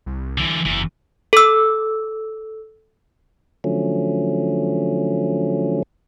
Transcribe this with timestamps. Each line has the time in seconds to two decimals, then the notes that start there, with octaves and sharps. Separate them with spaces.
0.06 C2
0.38 D3 E3
0.65 F#1 E2 E3
1.33 A4 E6
3.64 D3 F3 F#3 A3 C#4